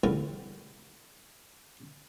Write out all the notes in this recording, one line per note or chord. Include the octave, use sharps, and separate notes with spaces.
A1 E2 A2 D3 G3 A#4